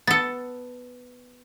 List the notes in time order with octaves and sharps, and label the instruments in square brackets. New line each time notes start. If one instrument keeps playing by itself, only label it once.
[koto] B3 A4 [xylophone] A6 C#7